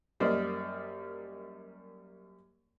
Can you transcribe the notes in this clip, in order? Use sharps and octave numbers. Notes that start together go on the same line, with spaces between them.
F#2 G3 A#3 C5 D5 D#5